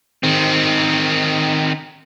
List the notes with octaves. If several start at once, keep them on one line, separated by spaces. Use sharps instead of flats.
D#3 C4